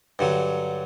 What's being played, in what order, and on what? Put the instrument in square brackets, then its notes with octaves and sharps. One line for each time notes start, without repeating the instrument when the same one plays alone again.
[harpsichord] G2 D3 F#3